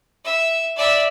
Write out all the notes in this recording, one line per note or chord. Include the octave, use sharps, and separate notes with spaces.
E5
D5 E5